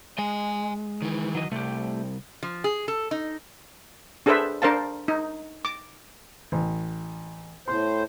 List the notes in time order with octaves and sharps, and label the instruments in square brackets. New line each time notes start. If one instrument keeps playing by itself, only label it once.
[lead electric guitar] G#3 [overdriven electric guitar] D#5 G#5
[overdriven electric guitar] D#3 E3
[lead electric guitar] F#3 D#5
[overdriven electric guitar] C2 [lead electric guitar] A3 G4
[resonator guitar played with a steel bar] F3
G#4
A4
D#4
[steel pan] D4 G#4 A4 B4 C5 E5
D4 A#4 C5 F5 A5
D#4
D6
[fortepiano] A1
[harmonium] A2 C5 [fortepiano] C6